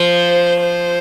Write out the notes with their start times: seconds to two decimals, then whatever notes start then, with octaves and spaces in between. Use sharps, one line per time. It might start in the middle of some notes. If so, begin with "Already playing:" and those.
Already playing: F3 C5
0.61 C5